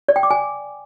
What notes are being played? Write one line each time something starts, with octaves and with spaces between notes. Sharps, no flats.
D5
G5
D6
G#5